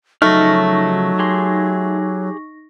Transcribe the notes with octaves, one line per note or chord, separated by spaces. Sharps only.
C#3 F3 F#3 A3 D#4 C#6 F6 A#6
G4 G#4 C6